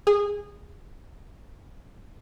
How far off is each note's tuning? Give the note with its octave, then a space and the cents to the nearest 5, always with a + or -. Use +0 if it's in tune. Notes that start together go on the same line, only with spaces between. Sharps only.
G#4 -20